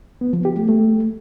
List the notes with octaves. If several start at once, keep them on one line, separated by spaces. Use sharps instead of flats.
B3
F3
G4
A3
A3